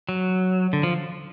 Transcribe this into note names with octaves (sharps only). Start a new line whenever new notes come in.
F#3
D3
F3